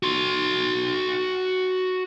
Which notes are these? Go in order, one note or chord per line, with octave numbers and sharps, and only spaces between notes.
F#4 C6